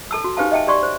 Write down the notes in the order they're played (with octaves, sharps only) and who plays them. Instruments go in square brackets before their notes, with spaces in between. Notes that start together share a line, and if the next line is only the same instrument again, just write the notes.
[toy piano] A4 A5 E6
F#4
D#4 G4 B4 C5 F5 A5
D#5 E5 G5 A5
G4 D5 C6 C#6
C5